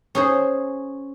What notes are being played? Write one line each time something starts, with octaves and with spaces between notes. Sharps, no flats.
C#4 G#4 C5